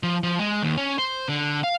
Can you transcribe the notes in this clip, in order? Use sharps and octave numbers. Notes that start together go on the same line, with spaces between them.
F3
F3
G#3
D#2
C#4
C5
D3
F5